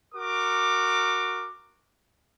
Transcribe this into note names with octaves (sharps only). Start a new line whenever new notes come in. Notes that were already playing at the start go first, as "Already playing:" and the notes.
F#4 A#4 D6